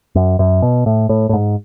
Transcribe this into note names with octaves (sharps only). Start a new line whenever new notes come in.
F#2
F#2
B2
A2
A2
A2
G#2